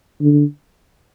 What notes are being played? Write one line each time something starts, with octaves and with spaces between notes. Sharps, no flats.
D3